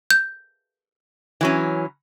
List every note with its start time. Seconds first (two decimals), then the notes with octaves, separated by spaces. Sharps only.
0.11 G6
1.41 E3 F#3 C#4